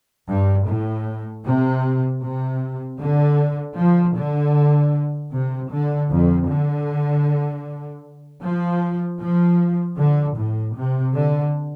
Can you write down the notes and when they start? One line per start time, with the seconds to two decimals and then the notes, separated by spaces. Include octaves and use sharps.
0.28 G2
0.67 A2
1.44 C3
2.22 C3
3.00 D3
3.77 F3
4.16 D3
5.32 C3
5.71 D3
6.10 F2
6.49 D3
8.43 F3
9.21 F3
9.98 D3
10.37 A2
10.76 C3
11.15 D3